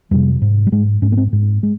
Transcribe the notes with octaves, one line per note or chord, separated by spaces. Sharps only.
F2 C3 G3
G#2
G3
G#2 G#3
G#2 C#4
A#3
C4
G#2
G#3